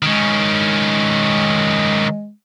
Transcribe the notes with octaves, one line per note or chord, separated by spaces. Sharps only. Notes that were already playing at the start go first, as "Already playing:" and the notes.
D#3 G#3 C#4